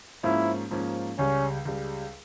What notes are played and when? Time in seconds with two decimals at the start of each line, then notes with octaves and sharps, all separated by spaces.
0.23 G#2 F3 A#3 C#4 E4 F4
0.71 G#2 F3 A#3 C#4 F4
1.18 C#2 C#3 G3 C#4
1.65 C#2 C#3 G3